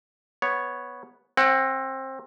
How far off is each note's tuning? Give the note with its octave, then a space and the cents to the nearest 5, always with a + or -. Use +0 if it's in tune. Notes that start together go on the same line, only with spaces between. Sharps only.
B3 -5 C#5 +0
C4 +25 F#5 +0